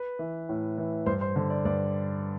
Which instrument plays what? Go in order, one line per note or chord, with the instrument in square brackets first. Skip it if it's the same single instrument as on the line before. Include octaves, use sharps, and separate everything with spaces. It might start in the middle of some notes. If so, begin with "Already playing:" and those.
Already playing: [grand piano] B4
E3
A2
E3
G2 C5
C5
D3 C5
D5
G2 D5